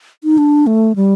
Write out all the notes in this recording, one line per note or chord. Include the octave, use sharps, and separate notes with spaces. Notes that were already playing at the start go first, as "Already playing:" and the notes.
D#4
D4
A3
G3